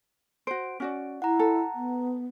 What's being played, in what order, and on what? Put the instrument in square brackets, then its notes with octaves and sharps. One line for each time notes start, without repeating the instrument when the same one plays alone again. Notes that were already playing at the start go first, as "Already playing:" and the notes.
[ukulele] F#4 C5 [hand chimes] D7
[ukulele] C#4 F#4 D5
[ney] E4 [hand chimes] F#5 A#5
[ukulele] A4
[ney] B3